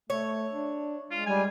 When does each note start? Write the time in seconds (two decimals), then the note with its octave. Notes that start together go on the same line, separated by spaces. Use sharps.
0.10 A3 C#5
0.51 D4
1.11 G#3 F4
1.27 G3 G#5